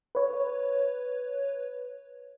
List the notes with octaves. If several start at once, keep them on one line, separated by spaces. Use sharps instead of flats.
B4 C#5